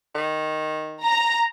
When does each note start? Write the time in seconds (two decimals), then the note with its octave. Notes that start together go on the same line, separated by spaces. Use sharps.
0.15 D#3
1.05 A#5